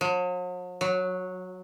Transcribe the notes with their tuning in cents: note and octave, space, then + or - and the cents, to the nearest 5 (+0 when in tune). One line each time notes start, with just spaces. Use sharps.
F#3 -45
F#3 -10